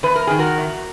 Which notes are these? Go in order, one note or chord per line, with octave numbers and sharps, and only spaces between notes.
E2 B4
A#4
D#3 G#4
F#4 A#4
E2